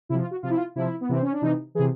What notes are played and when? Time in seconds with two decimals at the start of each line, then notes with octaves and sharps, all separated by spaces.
0.09 C3 F3 E4
0.21 F4
0.31 F#4
0.43 C3 F3 F4
0.50 E4
0.57 F4
0.76 C3 F3 E4
1.01 B3
1.09 C3 E3 C4
1.22 C#4
1.32 D4
1.42 C3 E3 D#4
1.75 C3 E3 G#4